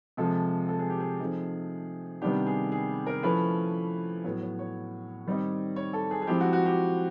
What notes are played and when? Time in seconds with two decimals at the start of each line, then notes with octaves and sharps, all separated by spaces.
0.17 C3 F3 G#3 A4
0.68 A4
0.79 G#4
0.90 G4
1.00 G#4
1.20 F3 A3 C4 D#4
2.22 C3 D#3 G3 B3 D4 G4
2.46 G#4
2.72 G#4
3.07 A#4
3.23 F3 A3 C#4 E4 B4
4.24 A2 F#3 B3 C#5
4.41 C#5
4.59 C#5
5.27 D#3 G3 C4 D#4
5.76 C#5
5.93 A4
6.11 G#4
6.22 G#4
6.27 F3 G#3 C4 E4 G4
6.40 F#4
6.53 F#4
6.66 G4